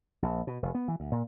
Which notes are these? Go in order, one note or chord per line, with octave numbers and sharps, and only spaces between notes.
A#1
B2
F1
B3
E3
D2
A#2